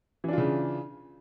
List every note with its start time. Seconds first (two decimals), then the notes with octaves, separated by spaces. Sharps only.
0.24 E3
0.28 D4
0.33 F4
0.38 C#3